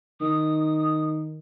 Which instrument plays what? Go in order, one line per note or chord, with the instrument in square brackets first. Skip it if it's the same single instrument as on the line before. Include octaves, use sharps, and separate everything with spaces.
[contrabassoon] D#3 [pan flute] D#6